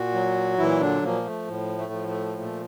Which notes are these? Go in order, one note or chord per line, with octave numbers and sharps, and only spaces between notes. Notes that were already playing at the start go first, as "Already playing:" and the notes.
Already playing: A#2 F#4
F#3
A#2 E3 E4
D3 D4
A#2 F3 A#3
A3
A2
A3
F3
A3
A#2 A3